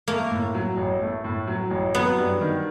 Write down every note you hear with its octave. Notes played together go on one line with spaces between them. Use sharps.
A3 A#3
A2
F#3
A1
A3
A2
F#3
A1
F#3 B3
G2
D#3